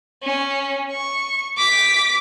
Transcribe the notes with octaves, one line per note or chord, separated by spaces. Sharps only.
C#4
C#6
D6 B6